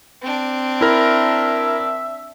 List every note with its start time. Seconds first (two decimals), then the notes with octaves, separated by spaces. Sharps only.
0.22 C4 D4
0.81 E4 A#4 E5